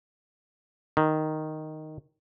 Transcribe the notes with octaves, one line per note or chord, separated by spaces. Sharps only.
D#3